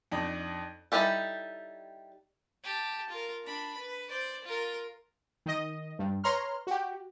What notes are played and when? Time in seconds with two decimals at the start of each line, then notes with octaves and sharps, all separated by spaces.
0.12 F2 D4 D#4
0.92 G3 D#4 E4 G4 A4
2.64 G4 A5
3.10 F4 A#4
3.45 D4 B5
3.78 B4
4.09 C5 D5
4.45 F4 A#4
5.46 D#3 D#5
5.99 G2
6.24 B4 C#5 A#5 C6 F6
6.67 F#4 G4